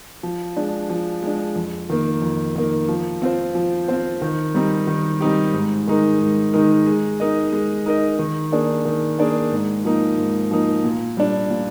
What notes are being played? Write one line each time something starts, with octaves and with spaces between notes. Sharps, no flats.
F3
G#3 D4
F3
G#3 D4
F2
D#3 A#3
F2
D#3 A#3
F3
C4 F4 C5
F3
C4 F4 C5
D#3
G3 C4 D#4 G4
D#3
G3 C4 D#4 G4
G#2
D#3 G#3 D#4 A#4
G#2
D#3 G#3 D#4 A#4
G#3
D#4 A#4 D#5
G#3
D#4 A#4 D#5
D#3
A#3 D4 G#4
D#3
A#3 D4 G#4
G#2
F3 A#3 D#4
G#2
F3 A#3 D#4
A#2
G3 D4
A#2